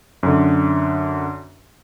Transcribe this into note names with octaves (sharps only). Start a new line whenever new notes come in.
F#2 D3